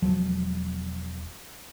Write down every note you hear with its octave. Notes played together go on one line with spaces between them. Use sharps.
E1 F3 F#3